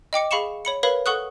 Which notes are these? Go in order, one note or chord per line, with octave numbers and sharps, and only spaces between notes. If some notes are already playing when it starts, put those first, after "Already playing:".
D#5 G5 D6 C#7
G#4 F5 B5 C#6 C#7 E7
C#5 B5 C#7
A#4 B4 C#5 F5 B5
A4 F#5 C#6 D#6 F#6